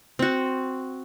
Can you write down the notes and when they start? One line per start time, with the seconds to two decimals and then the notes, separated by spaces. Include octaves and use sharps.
0.19 C4 F#4